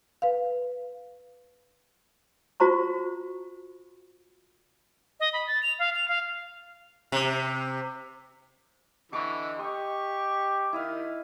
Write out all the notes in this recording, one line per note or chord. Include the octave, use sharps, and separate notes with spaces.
B4 F5
F4 F#4 C5 A#5 C#6
D#5
B5
A6
F7
F5
F7
F5
C3
D3 E3 D#5 C#6 D6
G4 D#5 C#6
D#3 E4 D#5 F5